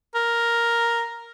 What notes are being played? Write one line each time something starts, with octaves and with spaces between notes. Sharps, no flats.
A#4